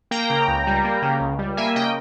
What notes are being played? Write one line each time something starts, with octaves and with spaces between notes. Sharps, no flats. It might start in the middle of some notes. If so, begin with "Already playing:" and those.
A#3 G5 A#5
C#3
C#2
G3
A#3
C#3
C#2
G3
A#3 E5 G#5
C#3 D#5 G5